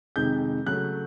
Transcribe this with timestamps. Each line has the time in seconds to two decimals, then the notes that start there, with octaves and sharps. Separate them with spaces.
0.16 F2 C3 D#3 G#3 G6
0.67 C#3 F#3 A3 F#6